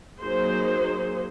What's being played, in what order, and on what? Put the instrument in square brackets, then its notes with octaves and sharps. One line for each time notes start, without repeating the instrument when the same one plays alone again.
[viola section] F#3 A#3 D#4 G#4 C5